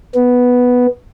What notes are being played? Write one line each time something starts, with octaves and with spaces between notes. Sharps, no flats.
B3